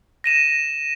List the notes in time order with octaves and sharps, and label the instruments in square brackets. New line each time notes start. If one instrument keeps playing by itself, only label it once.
[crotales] A#6 D#7 E7